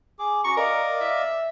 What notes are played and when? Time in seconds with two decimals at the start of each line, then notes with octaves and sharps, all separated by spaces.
0.19 G#4 D6
0.44 C#4 F#4 A#5 C#6
0.57 A#4 D5 D#5 F5
1.01 E5